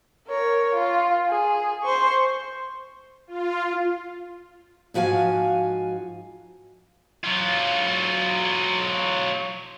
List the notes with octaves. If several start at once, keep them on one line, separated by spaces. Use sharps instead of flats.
A#4 C#5
F4
G#4
C5 C#6
F4
G#2 F3 F#4 F5 G#5
F#3 F4